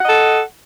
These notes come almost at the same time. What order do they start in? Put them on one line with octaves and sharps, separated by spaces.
F#5 D#5 A4